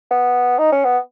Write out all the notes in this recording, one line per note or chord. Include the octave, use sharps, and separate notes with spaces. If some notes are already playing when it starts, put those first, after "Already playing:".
B3
D#4
C#4
B3